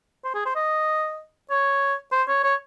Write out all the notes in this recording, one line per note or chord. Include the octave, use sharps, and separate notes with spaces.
C5
G#4
C5
D#5
C#5
C5
C#5
C#5